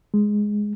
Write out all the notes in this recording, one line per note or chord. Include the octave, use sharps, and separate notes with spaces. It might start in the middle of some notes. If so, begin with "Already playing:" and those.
G#3